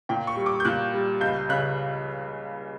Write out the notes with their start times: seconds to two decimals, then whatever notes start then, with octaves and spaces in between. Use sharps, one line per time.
0.09 A#2 G5
0.27 C#6
0.37 G3
0.46 D6
0.60 G6
0.65 A#2 F#6
0.94 G3
1.21 C#2 G6
1.49 C#3 F#6